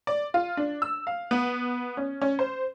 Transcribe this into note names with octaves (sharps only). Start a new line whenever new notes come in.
D5
F4
D4
E6
F5
B3
C#4
C#4
C5